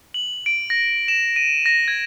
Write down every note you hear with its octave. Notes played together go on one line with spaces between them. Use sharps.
F#7
D7
A#6
E7
D#7
A#6
G#6